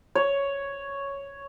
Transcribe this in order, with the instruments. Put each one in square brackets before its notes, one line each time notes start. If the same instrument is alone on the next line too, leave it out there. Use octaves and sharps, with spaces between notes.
[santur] C#5